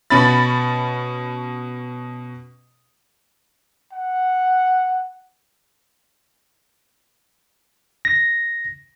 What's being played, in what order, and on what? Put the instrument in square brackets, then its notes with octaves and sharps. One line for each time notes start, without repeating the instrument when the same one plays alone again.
[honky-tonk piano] B2 C#4 B5 A6
[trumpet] F#5
[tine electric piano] A#6